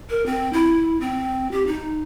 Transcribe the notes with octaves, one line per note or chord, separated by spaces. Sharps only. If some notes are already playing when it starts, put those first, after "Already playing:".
A#4
C4
E4
C4
G4
D#4